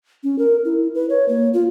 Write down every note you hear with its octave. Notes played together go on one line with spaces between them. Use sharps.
C#4
A#4
E4
B4
C#5
A#3
F4